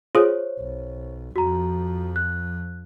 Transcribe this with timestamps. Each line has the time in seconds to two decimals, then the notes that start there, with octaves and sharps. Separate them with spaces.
0.15 F4 G#4 C5 C#5
0.59 B1
1.36 F2 F3 F#4 A#5
2.16 F#6